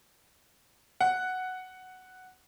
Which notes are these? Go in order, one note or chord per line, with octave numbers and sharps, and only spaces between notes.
F#5